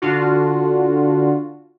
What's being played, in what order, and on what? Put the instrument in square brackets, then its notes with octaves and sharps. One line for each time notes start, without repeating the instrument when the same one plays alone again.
[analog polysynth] D3 D4 F4 F#4